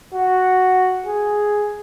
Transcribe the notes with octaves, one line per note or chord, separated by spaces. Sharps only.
F#4
G#4